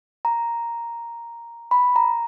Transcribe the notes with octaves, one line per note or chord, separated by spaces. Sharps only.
A#5
B5
A#5